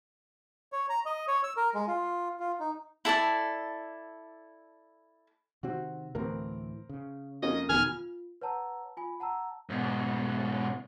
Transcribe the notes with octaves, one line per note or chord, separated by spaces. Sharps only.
C#5
A#5
D#5
C#5
E6
A#4
G#3
F4
F4
D#4
E4 A4 D5 A5
C3 D#3 C4 F#4
D2 A2 E3 C4 A#4
C#3
F2 A#3 C#4 D#5
F1 B2 D#3 G#5 F6
F4
B4 C#5 F#5 A5 A#5 E6
F4 G#5 B5
F#5 A5 A#5 E6
G#2 B2